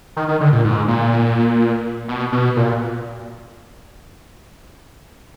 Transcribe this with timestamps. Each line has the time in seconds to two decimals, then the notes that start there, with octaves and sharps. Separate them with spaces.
0.17 D#3
0.28 D#3
0.41 D3
0.53 A#2
0.64 G#2
0.88 A#2
2.08 B2
2.32 B2
2.56 A#2